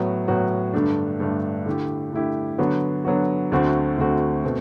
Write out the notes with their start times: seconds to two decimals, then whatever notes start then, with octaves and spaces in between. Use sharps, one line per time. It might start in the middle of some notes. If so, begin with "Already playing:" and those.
Already playing: A2 F#3 B3 F#4
0.28 A2 F#3 B3 F#4
0.74 G2 D3 A3 D4
1.20 G2 D3 A3 D4
1.66 D3 A3 E4 G4
2.13 D3 A3 E4 G4
2.58 D3 F#3 B3 F#4
3.05 D3 F#3 B3 F#4
3.52 D2 D3 A3 C4 F#4
3.98 D2 D3 A3 C4 F#4
4.44 B2 A3 C4